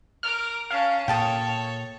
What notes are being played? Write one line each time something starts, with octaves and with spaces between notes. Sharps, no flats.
A#4 D6 F6
C#4 F5 A5
A#2 A4 C#5 G5 A5 D#6